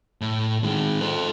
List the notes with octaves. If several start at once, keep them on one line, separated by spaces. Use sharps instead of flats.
A2
D#3 G#3
A4 C5